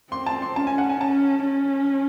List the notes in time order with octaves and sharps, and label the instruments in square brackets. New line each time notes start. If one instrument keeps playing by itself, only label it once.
[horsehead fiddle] C4 [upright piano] C6
[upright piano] A5
C6
[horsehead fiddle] C#4 [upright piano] A5
[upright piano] G#5
F#5
G#5
[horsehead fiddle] C#4 [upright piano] A5
[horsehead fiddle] C#4